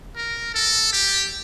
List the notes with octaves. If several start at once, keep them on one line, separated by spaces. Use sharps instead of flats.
A#4
A4
G4